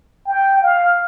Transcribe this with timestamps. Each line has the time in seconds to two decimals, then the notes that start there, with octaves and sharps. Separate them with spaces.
0.27 G5
0.63 F5